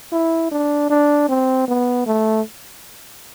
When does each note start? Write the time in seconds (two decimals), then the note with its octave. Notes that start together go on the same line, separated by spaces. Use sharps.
0.12 E4
0.51 D4
0.90 D4
1.29 C4
1.68 B3
2.06 A3